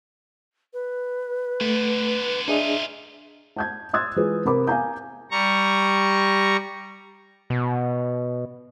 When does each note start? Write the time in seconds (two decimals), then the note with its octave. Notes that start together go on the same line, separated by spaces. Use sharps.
0.73 B4
1.61 D3 A3 B3
2.48 D4 D#4 F4 G#4 D#5 E5
3.57 A5 G6 G#6
3.93 C6 D#6 E6 F#6 G#6 A6
4.16 E3 G#3 F4 G#4 B4
4.45 C3 A#4 B5 D6
4.67 F5 G#5 A#5 G6
5.31 G3 A#5 C#6
7.50 B2